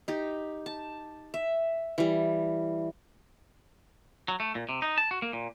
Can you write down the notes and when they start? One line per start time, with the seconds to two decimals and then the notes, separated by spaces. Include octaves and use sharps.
0.08 D#4 G4
0.66 A5
1.34 E5
1.98 E3 G3
4.28 F#3
4.40 A3
4.55 A#2
4.69 C3
4.82 D#4
4.98 A5
5.11 F#4
5.22 A#3
5.33 A#2